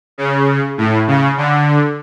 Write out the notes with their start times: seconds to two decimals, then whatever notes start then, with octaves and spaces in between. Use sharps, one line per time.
0.18 C#3
0.78 A2
1.07 C#3
1.37 D3